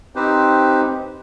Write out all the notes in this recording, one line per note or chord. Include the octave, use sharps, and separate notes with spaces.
C4 D#4 G4 B4 C5